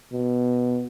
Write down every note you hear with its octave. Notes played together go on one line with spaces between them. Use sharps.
B2